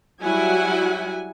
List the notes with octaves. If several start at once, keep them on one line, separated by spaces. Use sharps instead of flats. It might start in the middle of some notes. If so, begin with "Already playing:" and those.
F#3 G3 E4 F#4 F#5 G#5